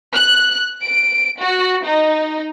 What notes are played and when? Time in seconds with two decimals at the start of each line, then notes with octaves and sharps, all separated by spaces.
0.15 F#6
0.83 D7
1.40 F#4
1.84 D#4